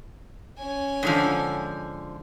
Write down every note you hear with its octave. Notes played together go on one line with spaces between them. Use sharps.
C#4 G#5
G#2 D3 F3